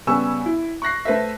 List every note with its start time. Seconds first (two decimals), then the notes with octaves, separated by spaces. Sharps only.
0.07 C#3 G3 B3 G#5 C#6 E6
0.46 E4
0.82 C#6 F#6 A#6 C7
1.05 A3 B4 C5 E5